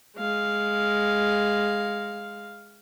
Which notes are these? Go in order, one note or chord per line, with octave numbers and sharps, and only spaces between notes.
G#3 F5